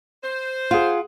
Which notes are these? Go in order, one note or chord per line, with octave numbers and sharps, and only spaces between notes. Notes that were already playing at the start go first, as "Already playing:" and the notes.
C5
F4 G#4 F#5